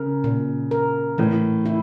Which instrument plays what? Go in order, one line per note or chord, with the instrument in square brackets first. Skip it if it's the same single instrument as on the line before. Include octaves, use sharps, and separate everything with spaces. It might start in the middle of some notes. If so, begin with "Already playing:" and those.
Already playing: [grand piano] C#3 [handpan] A#4
[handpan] A#2
A#4
[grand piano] A2 [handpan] E3
[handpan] E4